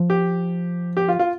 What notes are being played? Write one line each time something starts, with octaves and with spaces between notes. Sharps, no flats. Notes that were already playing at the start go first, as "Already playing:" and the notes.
Already playing: F3
G4
G4
F4
F4